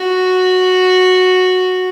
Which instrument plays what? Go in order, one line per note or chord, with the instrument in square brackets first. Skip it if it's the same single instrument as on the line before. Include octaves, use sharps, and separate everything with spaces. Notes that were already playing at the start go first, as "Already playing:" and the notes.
Already playing: [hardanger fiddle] F#4